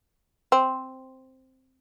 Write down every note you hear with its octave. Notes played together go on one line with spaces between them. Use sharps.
C4